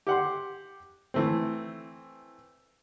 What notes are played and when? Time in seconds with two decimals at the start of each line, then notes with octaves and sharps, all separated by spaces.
0.07 G4 F#5 C6
1.14 E3 A3 C4